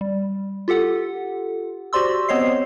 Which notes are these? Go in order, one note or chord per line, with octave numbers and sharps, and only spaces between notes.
G3
F4 G4 A4 F#5
F#4 G4 C5 D5 C6 E6
B3 C4 C5 C#5 D#5 C7